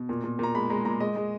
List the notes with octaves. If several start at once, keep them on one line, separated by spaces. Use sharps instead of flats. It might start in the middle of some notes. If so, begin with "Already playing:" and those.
Already playing: B2
A#2
A#2
A#2 A#5
G#3 B5
G#3 A#5
A#2 A#5
G#3 D#5
G#3